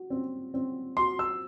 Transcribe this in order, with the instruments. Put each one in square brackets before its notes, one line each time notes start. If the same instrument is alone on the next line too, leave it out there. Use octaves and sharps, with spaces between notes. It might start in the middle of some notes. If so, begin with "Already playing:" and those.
Already playing: [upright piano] F#4
C4
C4
[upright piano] F#4 [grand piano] C6
[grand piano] E6